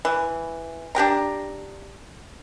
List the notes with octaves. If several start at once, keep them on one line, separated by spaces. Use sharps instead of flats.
E3
D4 G4 G5 A#5